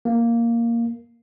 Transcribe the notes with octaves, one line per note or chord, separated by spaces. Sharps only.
A#3